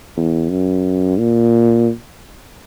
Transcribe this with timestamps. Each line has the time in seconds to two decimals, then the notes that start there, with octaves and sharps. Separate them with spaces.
0.16 E2
0.50 F#2
1.18 A#2